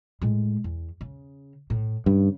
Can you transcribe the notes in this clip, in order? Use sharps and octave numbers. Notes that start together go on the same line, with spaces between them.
A2 G#3
E2
C#3
A2
G2 C#3